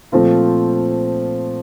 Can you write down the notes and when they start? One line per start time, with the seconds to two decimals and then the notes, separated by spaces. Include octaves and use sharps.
0.12 A#2 F3 A3 C4 F4